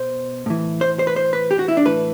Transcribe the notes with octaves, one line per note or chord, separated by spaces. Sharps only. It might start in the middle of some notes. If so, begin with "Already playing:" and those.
Already playing: B2 C5
A2 E3
C5
C5
B4
C5
B4
G4
F#4
E4
D4
A2 E3 B4